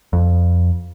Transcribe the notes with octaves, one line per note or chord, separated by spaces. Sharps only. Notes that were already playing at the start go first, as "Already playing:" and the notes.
F2